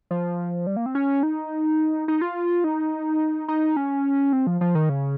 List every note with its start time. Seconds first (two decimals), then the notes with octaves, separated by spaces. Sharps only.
0.11 F3
0.67 G3
0.77 A#3
0.86 C4
0.95 C#4
1.23 D#4
2.08 D#4
2.21 F4
2.64 D#4
3.48 D#4
3.77 C#4
4.33 C4
4.47 F3
4.61 F3
4.75 D#3
4.89 C#3